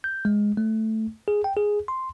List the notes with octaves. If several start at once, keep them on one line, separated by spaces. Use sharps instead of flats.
G6
G#3
A3
G#4
G5
G#4
C6